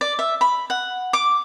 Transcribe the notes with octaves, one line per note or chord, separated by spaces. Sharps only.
D5
E5
B5
F#5
D6